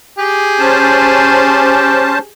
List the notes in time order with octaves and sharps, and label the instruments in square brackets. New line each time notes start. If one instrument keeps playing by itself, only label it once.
[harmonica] G4 G#4
[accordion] C#4 C5 A5